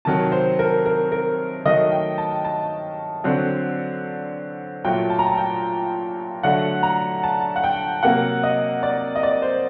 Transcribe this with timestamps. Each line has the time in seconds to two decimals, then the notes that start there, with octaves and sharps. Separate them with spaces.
0.05 C3 D#3 F#3 A5
0.32 C5
0.59 A#4
0.86 A#4
1.12 A#4
1.65 D#3 F#3 A3 D#5
1.92 G5
2.18 A5
2.45 A5
3.24 D3 F#3 C4
4.85 A#2 F#3 A3 G5
5.10 A5
5.19 A#5
5.27 A5
5.37 G5
6.43 D3 F#3 A3 F#5
6.83 A#5
7.23 A5
7.56 F#5
7.64 G5
8.03 C3 F#3 A#3 F#5
8.43 D#5
8.83 D5
9.16 D#5
9.23 D5
9.42 C5